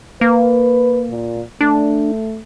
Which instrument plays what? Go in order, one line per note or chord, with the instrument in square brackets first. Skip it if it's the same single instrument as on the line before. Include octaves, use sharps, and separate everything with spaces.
[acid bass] A#3 [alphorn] B4
[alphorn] A#2
[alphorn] A3 [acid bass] D4